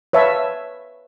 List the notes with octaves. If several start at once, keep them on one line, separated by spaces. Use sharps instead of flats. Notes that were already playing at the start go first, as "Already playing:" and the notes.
B4 C#5 E5 F5 A5